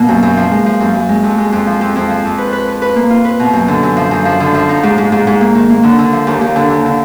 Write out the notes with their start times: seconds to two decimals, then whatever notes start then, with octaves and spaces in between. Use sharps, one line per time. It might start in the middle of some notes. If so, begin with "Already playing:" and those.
Already playing: B2 A#3
0.09 F#2
0.23 F#2
0.37 F3
0.51 G#3
0.66 F3
0.80 F#2
0.95 F#2
1.09 G#3
1.23 F2
1.38 G#3
1.52 F2
1.67 F3
1.81 F2
1.96 F2
2.10 F3
2.25 F2
2.38 B4
2.53 B4
2.68 B4
2.82 B4
2.96 A#3
3.10 F4
3.25 B4
3.40 B2
3.53 F#2
3.68 D3
3.83 F#2
3.97 F3
4.11 F#2
4.25 F3
4.40 D3
4.55 F3
4.69 D#4
4.83 G#2
4.98 G#2
5.12 G#2
5.27 G#2
5.41 A#3
5.55 D#3
5.70 A#3
5.83 D3
5.99 D3
6.12 F3
6.27 D#2
6.41 D#2
6.56 D3
6.70 D#2
6.85 D3